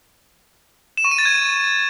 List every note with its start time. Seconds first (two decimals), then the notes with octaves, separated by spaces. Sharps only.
0.97 E7
1.04 C#6
1.11 D#7
1.18 A6
1.25 G#6